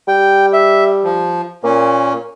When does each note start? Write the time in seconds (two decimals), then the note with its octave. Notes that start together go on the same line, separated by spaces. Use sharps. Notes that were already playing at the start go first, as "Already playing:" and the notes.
0.08 G3 G5
0.53 E5
1.04 F3
1.64 A#2 A#3 C#4